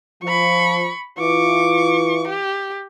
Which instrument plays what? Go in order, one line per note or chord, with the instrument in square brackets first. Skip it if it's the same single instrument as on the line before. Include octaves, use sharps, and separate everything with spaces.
[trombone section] F3 [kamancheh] B5 C#6
[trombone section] E3 F4 [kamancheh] C#6 D6
[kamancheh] G4